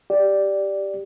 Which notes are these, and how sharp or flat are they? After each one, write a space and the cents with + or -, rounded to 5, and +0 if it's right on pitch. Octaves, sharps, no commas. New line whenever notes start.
G4 +0 D5 +0